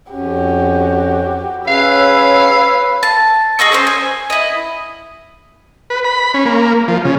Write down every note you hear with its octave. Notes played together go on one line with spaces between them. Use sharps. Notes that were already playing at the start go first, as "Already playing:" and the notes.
F2 C#4 F#4 G4
C#4 G#4 B4 C#5 F5 E6
A5
G#4 D#5 C#6 E6
C#4 G#4 C5
G#5
E4 D#5
B4
B5
C#4
A#3
F3
C#3